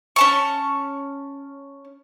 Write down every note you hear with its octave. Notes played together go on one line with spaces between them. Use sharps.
C#4 A5 C#6